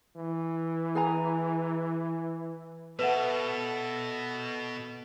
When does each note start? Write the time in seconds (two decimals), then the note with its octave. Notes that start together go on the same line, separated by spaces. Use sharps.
0.16 E3
0.95 G#4 G#5 A#5
2.99 B2 A4 B4 E5 F#5